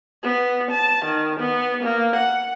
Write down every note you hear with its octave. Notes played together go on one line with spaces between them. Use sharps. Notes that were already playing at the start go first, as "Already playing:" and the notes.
B3
A5
D#3
B3
A#3
F#5